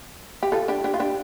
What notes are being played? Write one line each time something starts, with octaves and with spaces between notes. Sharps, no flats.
G4
F4 A4
D4 G4
D4 G4
F4
D4 G4